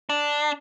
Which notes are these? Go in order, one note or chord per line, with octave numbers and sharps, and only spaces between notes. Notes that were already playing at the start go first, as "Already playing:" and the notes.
D4